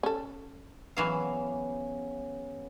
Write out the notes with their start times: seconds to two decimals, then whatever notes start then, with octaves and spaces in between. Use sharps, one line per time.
0.03 C#4 A4
0.97 C#3 E3 F#3 B3 F5